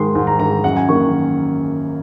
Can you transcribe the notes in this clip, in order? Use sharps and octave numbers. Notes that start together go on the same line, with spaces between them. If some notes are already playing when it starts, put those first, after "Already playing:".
Already playing: G#2 D#3 G#3 C6
G#2
A#5
D#3 G#3 A#5
F#2 F#5
G#5
D#3 A#3 C#6